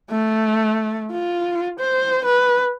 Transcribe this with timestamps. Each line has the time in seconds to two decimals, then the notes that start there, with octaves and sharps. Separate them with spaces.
0.11 A3
1.11 F4
1.80 C5
2.25 B4